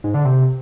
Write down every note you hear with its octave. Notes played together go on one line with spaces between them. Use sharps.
G#2
D3
C3